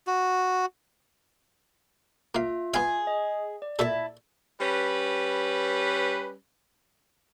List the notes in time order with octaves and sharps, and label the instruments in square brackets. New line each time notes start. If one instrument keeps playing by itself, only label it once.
[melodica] F#4
[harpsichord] A#3 F5 [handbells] F4 E5
[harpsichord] B3 F5 [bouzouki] G#4
[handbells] D#5
D5
[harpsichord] A#2 A4 [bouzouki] E4 A5
[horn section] G3 C#4 B4